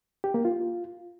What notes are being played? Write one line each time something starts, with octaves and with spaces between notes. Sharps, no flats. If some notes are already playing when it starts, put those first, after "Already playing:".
G4
A#3
F4